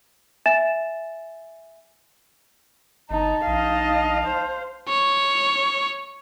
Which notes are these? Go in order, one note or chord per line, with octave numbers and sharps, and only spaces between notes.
E5 G#5 A6 E7
G1 D#4 A5
A#1 D#4 D#5 F5
C5
C#5